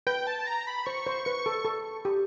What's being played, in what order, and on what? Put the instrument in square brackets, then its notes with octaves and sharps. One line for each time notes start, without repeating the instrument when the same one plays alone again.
[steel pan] B4 [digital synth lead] G5
[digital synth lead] A5
A#5
B5
[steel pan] C5 [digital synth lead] C#6
[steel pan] C5
[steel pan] B4 [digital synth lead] C#6
[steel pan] A4
A4
G4